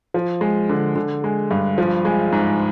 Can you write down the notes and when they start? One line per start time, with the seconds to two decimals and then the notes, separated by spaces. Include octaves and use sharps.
0.14 F3
0.41 G#3
0.69 D3
0.96 D3
1.24 G#3
1.51 G2
1.78 F3
2.05 G#3
2.32 G#2